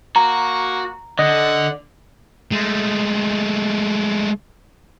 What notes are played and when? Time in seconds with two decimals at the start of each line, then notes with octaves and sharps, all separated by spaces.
0.16 A#3 F#4 A#5
1.19 D3 D#5 F#5
2.52 G#3 A3